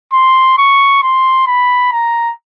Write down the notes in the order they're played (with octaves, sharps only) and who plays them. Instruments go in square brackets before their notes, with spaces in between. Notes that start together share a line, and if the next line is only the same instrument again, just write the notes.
[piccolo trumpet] C6
C#6
C6
B5
A#5